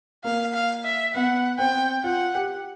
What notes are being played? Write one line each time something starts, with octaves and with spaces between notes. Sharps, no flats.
A#3 F5
F5
E5
B3 F#5
C4 G5
F4 F#5
G4